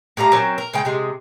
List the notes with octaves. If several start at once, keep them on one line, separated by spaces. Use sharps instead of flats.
A2 G3 F5 A#5
F#3 C4 C#4 A#4
A#4
C#3 G#3 G5
C3 G#3